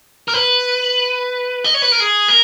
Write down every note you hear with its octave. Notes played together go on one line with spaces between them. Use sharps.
A#4
B4
D#5
C#5
B4
A#4
G#4
A#4